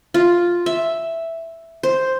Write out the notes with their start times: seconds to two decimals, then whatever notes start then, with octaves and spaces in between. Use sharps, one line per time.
0.14 F4
0.66 E5
1.83 C5